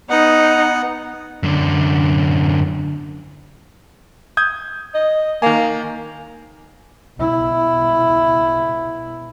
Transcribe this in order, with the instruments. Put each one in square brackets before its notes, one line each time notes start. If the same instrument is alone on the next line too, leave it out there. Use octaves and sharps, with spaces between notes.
[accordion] B3 F#5 [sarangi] D#4
[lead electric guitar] F#2 D3
[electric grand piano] D#6 G6 G#6
[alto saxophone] D#5
[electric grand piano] D#3 G#5 [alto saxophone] A#3
[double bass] B2 E4